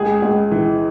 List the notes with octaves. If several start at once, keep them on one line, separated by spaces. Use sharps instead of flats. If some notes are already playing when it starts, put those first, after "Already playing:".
Already playing: C#2 G#4
C#2
E3